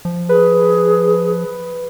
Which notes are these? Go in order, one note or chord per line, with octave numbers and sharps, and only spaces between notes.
F3
G#4 B4